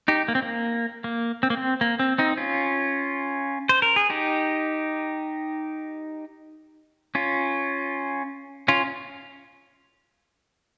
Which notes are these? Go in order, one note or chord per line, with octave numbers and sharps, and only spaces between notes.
D#4 G4
A#3
C4
A#3
A#3
C4
A#3
C4
A#3
C4
C4 D#4
C#4 F4
C5
A#4
G#4
D#4 G4
C#4 F4
C#4 F4